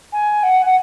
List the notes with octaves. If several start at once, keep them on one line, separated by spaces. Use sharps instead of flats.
G#5
F#5
F#5